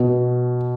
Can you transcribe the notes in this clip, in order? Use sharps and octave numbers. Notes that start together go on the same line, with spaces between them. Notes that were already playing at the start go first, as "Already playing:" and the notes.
Already playing: B2